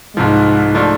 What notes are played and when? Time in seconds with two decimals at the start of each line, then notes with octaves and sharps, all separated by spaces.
0.17 C2 G#2 C3 F3
0.75 C3 F3 A3 D4